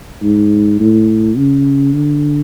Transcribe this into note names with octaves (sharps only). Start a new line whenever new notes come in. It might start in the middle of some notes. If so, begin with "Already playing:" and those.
G#2
A2
C#3
D3